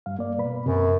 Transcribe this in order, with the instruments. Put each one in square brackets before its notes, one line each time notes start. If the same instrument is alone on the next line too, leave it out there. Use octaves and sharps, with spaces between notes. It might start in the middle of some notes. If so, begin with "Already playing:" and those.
[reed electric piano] G2 F5
A#3 D5
B2 B4 B5
[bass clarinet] F#2 [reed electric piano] C3